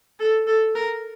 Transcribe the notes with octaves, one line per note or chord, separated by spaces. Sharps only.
A4
A4
A#4